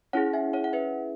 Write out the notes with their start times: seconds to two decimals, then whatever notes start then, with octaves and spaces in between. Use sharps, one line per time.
0.13 C#4 E4 G#4 C#5 F#5
0.33 E5 G#5
0.53 C#5 F#5
0.64 F#5
0.73 B4 E5